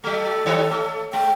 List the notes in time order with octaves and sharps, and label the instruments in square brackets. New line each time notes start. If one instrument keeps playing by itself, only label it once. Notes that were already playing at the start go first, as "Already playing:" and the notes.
[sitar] F#3 A3 [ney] A4
[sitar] D#3 G3 C#5
A3
[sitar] G#3 [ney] G5